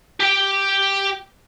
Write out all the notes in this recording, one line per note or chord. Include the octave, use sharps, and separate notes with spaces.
G4 G5